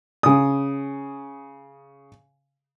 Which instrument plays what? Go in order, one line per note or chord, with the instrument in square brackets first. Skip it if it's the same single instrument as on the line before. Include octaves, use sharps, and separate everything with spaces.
[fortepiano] C#3 D#6